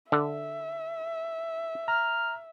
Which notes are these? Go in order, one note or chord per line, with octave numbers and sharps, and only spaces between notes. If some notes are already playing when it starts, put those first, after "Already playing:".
D3 E5
A#5 F6